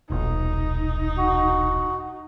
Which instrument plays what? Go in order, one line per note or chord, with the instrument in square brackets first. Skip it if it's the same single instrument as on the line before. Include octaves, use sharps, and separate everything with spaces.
[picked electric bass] D#1 B1 [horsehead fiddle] D#4
[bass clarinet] F#4